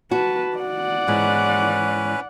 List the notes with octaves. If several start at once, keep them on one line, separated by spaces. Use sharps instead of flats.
F#4 B4 A5
D5 F#5
G#2 E3 G#3 C#4 B4